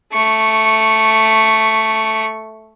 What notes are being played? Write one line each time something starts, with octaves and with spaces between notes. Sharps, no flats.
A3 C#6